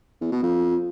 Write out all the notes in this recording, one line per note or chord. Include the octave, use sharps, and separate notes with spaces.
E2
B2
F2